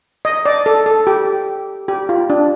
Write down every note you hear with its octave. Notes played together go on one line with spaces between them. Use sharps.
D#5
D5
A4
A4
G4
G4
F4
D4